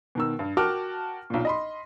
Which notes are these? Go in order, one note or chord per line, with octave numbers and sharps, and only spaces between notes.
B2 D#3 E6
G2
F#4 A#4 G5 A5 D6 F6
B1 A#2
D#5 B5 C6